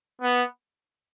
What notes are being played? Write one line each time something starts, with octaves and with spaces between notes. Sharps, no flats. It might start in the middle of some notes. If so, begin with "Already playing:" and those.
B3